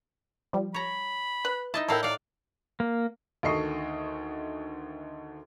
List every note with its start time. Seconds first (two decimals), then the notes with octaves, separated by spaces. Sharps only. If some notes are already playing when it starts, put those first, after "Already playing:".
0.53 F3 G3
0.74 C#5 A#5 B5
1.45 B4 F#6
1.74 D#4 E4 D#5 A5
1.88 A2 E4 A4 A#4 F5 G5
2.03 D5 F5 F#5
2.80 A#3
3.43 D2 D#3 A4 D#5 C#6 C7